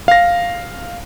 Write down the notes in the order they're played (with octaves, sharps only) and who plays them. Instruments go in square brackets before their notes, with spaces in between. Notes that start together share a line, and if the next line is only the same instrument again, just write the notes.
[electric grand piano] F5 A#6